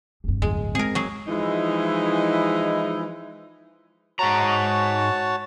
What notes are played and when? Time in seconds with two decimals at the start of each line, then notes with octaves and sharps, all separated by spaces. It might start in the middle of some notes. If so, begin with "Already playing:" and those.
0.24 F1 G2
0.42 D1 G1 E2 G#3
0.75 G#3 C4 G#4 A#4
0.95 F#3 G#4
1.28 E3 F3 G#3 D#4 E4
4.19 G#2 F#4 C#5 A5 A#5